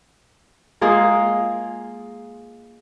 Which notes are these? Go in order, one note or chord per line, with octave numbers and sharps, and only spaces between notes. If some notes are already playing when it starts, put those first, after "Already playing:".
G#3 A#3 F4 G#4